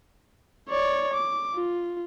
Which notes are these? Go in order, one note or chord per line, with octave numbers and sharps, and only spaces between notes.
C#5 D5
D6
F4